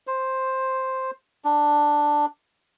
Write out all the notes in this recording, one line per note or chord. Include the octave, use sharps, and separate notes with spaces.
C5
D4